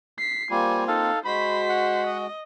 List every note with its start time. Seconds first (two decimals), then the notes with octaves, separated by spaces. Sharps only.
0.18 B6 C7
0.51 G3 A#3 C4 F4 G#5
0.88 D#4 A4 F5
1.25 G#3 F#4 C5 B5 B6
1.69 F#5
2.07 D#5